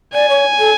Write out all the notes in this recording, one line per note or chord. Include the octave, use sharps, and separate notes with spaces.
D5 G#5
C#5
A4